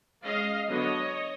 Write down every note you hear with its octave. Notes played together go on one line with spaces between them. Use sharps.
G#3 C#4 D#5 F5
D3 F#3 B3 C#5 D#5